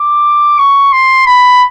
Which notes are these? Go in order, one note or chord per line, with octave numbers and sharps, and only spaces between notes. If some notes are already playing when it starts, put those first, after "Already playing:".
Already playing: D6
C#6
C6
B5